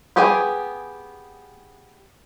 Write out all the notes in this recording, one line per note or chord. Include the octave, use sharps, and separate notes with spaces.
B3 G4 G#4 G5 G#5